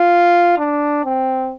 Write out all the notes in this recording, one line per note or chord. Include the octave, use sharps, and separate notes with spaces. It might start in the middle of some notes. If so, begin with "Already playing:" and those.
Already playing: F4
D4
C4